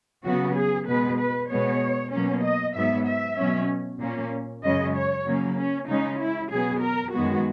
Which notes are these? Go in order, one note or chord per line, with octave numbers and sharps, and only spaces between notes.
C#3 F#3 B3 F#4
G#4
B2 G#3 B3 B4
B4
B2 G#3 B3 C#5
B2 F#3 A#3 C#4
D#5
G#2 F#3 B3 E5
E5
B2 F#3 C#4
A#2 A#3 C#4
F#2 C#3 G#3 C#4 D#5
C#5
C#3 F#3 A#3 C#4
C#4
C#3 G#3 C#4 D#4
E4
B2 F#3 B3 G#4
A#4
F#2 D#3 G#3 B3 F#4